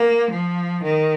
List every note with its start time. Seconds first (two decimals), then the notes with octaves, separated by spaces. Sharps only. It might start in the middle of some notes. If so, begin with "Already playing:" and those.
Already playing: A#3
0.31 F3
0.84 D#3